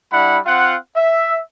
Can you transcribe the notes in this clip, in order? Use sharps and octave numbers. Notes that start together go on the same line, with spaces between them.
G3 D4 E4 F#5 B5
C4 F4 F5 F#5
E5